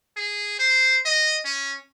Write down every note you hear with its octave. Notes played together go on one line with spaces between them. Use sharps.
G#4
C5
D#5
C#4